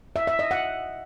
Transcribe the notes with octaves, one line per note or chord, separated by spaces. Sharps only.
E5
E5
D#5
F#5